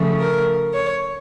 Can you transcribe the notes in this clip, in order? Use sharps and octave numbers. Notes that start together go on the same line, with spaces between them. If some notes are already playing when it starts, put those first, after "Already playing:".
Already playing: C#3 F3 A3
A#4
C#5